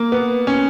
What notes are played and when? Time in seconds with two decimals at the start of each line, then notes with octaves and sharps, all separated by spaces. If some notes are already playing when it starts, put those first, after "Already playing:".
Already playing: A#3
0.12 B3
0.47 C#4